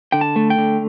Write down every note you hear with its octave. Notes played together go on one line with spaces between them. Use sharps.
D3 G5
A5
A3
G5
D3